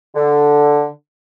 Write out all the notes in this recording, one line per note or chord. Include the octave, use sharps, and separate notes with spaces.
D3